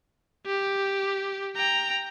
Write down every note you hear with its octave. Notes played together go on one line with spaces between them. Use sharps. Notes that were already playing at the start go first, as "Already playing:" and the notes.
G4
G5 A#5